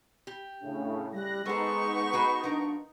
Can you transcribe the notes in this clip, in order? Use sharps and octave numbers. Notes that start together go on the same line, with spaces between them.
G4
A2 C#3 D4
G3 F#6 A#6
G#3 B3 D#4 A4 C5 C#6
F#4 G#4 B4
F3 D4 A#4